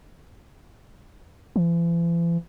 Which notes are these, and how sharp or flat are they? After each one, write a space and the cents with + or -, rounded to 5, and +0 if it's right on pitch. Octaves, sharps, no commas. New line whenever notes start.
E3 +45